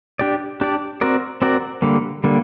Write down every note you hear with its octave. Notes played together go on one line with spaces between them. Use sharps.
D4 G4 D5
D4 G4 D5
C4 F#4 A#4 D5
C4 F#4 A#4 D5
D3 G3 A#3
D3 G3 A#3